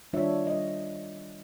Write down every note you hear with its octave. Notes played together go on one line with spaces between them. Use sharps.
D#3 G3 D4 F4 C#5 E5
G3 D#5